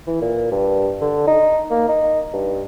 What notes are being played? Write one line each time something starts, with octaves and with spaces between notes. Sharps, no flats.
E3
A#2
G2
D3
D#4
A#3
D#4
G2